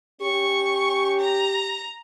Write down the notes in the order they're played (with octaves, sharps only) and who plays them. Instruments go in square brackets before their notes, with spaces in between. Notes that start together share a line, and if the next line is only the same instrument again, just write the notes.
[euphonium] C#4 [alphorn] G4 [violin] C#6
[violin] A#5